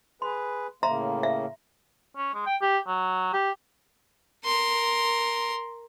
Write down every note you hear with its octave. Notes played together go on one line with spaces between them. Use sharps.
G#4 B4 C6
A2 C#3 A#3 E5 A#5 C6
E5
C#4
G#3
G5
G4
F#3
G4
A#4 C6